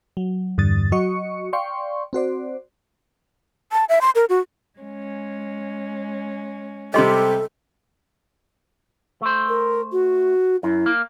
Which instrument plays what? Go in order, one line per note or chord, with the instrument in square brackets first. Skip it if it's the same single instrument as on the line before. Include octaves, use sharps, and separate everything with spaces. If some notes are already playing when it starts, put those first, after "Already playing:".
[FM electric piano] F#3
E2 G2 D3 D#6 A6
F#3 F#4 D#5 C#6 C#7
D5 F5 G5 C6 C#6
C4 F#4 C5 D5
[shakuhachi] A5
E5
C6
A#4
F#4
[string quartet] G#3 C#4
[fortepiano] C3 G3 G4 [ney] A4 [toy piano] D#5 C6
[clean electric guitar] A3 C5
[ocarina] A#4
F#4
[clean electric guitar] F#2 [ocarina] E4
[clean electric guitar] A#3